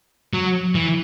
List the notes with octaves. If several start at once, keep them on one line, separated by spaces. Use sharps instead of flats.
F#3
E3